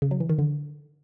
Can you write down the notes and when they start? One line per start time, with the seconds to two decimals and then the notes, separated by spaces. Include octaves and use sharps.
0.02 C#3
0.11 F#3
0.20 E3
0.29 D#3
0.39 D3